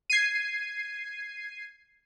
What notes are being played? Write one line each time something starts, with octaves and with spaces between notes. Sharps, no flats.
G#6 C7 D#7